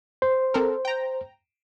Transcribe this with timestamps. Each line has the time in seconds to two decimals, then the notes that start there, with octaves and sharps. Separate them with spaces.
0.22 C5
0.54 C4 A4 A#4
0.85 G5 A#5